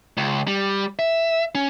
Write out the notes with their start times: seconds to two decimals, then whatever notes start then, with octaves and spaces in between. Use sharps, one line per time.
0.17 C#2
0.47 G3
0.99 E5
1.55 C#4